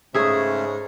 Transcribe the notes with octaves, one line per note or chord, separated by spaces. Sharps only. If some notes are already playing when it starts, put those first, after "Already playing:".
G#2 C#3 A3 C#4 G#4 E5